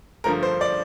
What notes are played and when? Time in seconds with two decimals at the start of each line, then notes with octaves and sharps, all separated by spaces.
0.24 G2 D3 F3 A3 A#4
0.43 C5
0.61 D5